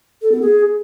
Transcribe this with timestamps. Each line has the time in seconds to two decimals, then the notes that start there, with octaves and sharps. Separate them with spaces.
0.22 A4
0.32 B3
0.42 G#4